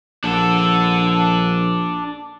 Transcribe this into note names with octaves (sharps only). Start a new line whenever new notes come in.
A#1 D4 A4